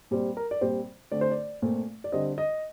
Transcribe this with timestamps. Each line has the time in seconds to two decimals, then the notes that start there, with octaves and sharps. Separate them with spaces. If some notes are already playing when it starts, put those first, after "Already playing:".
0.11 A#2 G3 C4
0.37 A#4
0.51 D5
0.61 A#2 G3 C4 C5
1.12 D3 A3 C4 D5
1.21 C5
1.31 D5
1.62 A#2 A3 C4
2.04 D5
2.12 D3 G3 C4 D#5
2.38 D#5